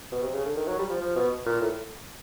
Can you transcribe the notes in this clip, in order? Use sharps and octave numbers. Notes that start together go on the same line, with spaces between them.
B2
C3
C#3
D3
D#3
F#3
G3
F3
F3
B2
A#2
A2